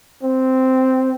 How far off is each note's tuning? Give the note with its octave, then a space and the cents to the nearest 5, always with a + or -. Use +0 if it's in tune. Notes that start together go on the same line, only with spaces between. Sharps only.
C4 -5